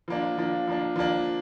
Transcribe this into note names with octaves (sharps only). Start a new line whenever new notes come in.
F3 A#3 D4
F3 A#3 D4
F3 A#3 D4
F3 A#3 D4